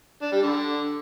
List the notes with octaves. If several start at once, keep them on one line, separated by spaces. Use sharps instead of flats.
D4
G3
D3